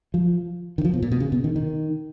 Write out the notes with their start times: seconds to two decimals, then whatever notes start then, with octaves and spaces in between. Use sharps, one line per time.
0.14 F3
0.78 D#3
0.85 F3
0.93 B2
1.02 A#2
1.12 B2
1.20 C#3
1.32 B2
1.44 D#3
1.56 D#3